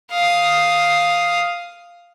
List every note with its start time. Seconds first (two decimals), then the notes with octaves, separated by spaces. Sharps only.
0.11 F5 D#6